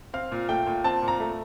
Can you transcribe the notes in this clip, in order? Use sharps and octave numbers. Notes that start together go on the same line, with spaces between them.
C4 F5
A#2
A3 G5
A#2
C4 A5
A#2
A#5
A3